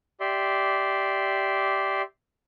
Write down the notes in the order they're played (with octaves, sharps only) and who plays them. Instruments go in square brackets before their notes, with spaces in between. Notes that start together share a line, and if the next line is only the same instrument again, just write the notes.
[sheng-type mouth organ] G4 D5 E5 C6